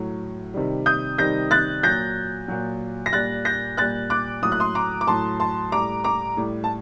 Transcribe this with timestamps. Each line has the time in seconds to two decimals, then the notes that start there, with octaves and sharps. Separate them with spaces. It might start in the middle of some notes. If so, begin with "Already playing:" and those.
Already playing: A2 F#3
0.54 C3 D#3 G3
0.86 D#6 G6
1.18 C3 D#3 G3 G6 A#6
1.51 F#6 A6
1.83 A#2 F#3 G6 A#6
2.48 A#2 F#3
3.06 A#6
3.13 A#2 G3 F#6 A6
3.45 G6 A#6
3.77 A#2 G3 F#6 A6
4.10 D6 F#6
4.43 A2 F#3 D#6
4.52 F#6
4.60 C6 D#6
4.75 A#5 D6
5.01 D6
5.07 A2 F#3 A5 C6
5.40 A5 C6
5.72 A2 G3 A#5 D6
6.04 A#5 D6
6.37 A2 G3
6.64 A5